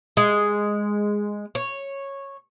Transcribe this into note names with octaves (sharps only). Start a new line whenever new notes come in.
G#3
C#5